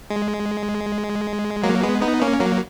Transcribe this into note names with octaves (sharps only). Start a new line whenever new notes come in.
G#3
F#3 A#3
G#3 B3
B3 D#4
A#3 C#4
F#3 A#3